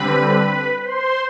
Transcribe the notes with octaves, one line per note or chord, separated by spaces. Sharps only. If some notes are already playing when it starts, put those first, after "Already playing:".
Already playing: D3 G3 C4 B4 B5
C5 C6